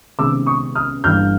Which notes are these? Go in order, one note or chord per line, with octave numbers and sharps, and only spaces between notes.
C#2 C3 D#3 G#3 B3 D6 E6
C#6 D#6
D#6 F6
G1 G2 E3 G3 A#3 F6 G6